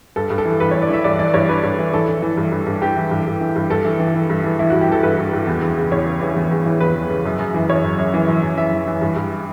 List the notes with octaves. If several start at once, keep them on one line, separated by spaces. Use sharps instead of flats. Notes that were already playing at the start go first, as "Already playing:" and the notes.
G2 A4
G2
A4
E3
G2 B4
C#5
E3
D5
E3 E5
G2 D5
E3 D5
G2 C#5
G2 B4
G2
E3
E3 A4
E3
E3
G2
G2
G2
G2 G4
E3
G2
G2
E3
G2
G2 A4
E3
E3
E3
G2
E3
E3 E4
F#4
G2
G4
E3 A4
G2 B4
G2
G2
E2
E2
C#3
E2 C#5
C#3
E3
E2
E2
E3
E2 B4
E2
C#3
F#2
F#2
E3
F#2 C#5
F#2
F#2
E3
F#2
F#2
E3 E5
E3
E3
G2
G2